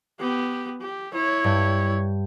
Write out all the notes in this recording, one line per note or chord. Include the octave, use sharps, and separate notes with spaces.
B3 G4
G4
E4 C#5
G2 G5